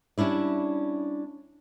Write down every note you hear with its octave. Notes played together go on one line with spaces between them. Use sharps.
G3 C#4 D4 E4 D5